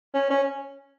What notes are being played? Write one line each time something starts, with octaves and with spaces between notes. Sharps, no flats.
C#4
C#4